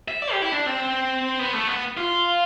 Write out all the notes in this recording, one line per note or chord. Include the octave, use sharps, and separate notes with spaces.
E5
D5
G4
E4
D4
C4
B3
A3
B3
F4